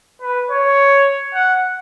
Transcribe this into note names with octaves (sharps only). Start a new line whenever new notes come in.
B4
C#5
F#5